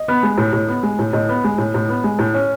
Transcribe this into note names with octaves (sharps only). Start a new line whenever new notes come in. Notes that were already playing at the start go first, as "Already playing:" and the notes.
Already playing: D#5
B3
G#3
A2
A2
B3
G#3
A2
A2 D#5
B3
G#3
A2
A2
B3
G#3
A2
C#4